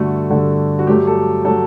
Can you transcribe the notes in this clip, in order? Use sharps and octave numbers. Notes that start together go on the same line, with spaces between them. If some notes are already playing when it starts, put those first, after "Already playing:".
Already playing: G2 D3 A3 F#4
G2 D3 A3
F#4
G2 F#3 A3 G4
A4
F#3 A3 A4